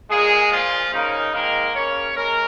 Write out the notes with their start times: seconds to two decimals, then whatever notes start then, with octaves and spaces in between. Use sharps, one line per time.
0.10 A#2 G#3 A#3 G#4
0.52 A#2 F3 A#3 F4
0.93 C#3 A#3 D#4
1.34 G#2 D#3 G#3 A#3 A#4
1.75 C#3 A#3 C#4 C#5
2.17 C#3 G#3 A#4